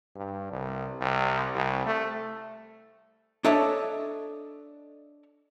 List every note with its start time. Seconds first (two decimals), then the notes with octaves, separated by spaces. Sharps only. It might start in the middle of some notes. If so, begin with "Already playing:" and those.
0.16 G2
0.52 C2
1.01 C2
1.55 C2
1.86 A3
3.45 D4 A4 C#5 D#5 E5 A5